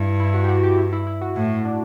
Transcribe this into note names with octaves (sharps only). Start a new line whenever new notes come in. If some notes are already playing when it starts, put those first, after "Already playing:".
Already playing: G2 E4
E4
F#4
G4
F#4
G4
E4
E4
E4
F#4
A2 E4
D4